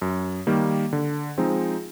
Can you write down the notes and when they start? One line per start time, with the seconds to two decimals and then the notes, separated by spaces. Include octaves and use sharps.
0.02 F#2
0.47 D#3 G3 A#3
0.93 D3
1.38 F3 G#3 C4 D#4